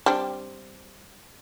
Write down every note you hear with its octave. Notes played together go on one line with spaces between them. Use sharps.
G3 C4 D4